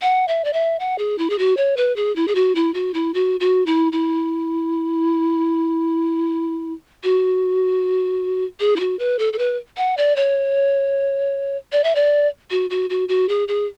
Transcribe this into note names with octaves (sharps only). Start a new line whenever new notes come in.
F#5
E5
D5
E5
F#5
G#4
E4
G#4
F#4
C#5
B4
G#4
E4
G#4
F#4
E4
F#4
E4
F#4
F#4
E4
E4
F#4
G#4
E4
F#4
B4
A4
A4
B4
F#5
D5
C#5
D5
E5
D5
F#4
F#4
F#4
F#4
G#4
G#4